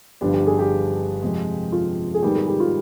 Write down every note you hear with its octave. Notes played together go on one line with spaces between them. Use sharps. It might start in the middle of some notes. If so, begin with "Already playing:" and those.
G1 G2 F3 B3 D4 G4
G4
G#4
G4
F2 C3 F3 G#3
F4
G#4
G#2 D#3 G3 B3 G4
G#4
G4
F4